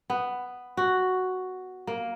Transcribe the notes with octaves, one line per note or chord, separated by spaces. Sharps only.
B3
F#4
A#3